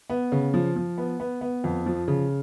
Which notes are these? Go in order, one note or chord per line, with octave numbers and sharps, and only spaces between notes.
B3
C#3
F3
F3
B3
B3
B3
F2
F3
C#3